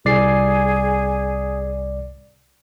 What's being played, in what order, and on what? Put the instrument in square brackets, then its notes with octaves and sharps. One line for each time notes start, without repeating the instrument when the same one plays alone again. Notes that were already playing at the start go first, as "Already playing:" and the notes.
[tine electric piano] C2 D5 C7 [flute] G#4